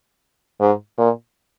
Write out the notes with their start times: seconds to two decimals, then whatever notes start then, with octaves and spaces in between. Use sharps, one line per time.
0.60 G#2
0.98 A#2